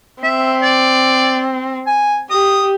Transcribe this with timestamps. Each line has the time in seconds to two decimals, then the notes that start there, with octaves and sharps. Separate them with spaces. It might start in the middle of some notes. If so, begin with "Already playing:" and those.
0.23 C4 E5
0.63 D5
1.87 G#5
2.30 G4 D#6